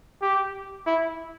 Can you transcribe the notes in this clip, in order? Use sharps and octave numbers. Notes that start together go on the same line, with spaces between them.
G4
E4